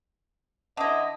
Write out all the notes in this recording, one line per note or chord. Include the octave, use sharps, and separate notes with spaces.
D3 E4 D#5